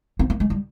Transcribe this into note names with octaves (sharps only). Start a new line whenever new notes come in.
C4
A#3
G#3
G3